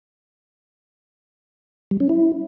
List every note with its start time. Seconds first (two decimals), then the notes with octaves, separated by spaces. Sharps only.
1.91 G3
2.00 C#4
2.09 E4